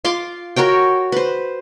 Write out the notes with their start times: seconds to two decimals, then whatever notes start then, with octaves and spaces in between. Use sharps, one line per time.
0.05 F4 F5 C6 D6
0.56 F#4 A#4 C#5 G5
1.12 B4 C5